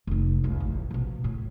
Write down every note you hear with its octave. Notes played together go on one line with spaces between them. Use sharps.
F1 D#4
C#2
A1
B2 F3
A2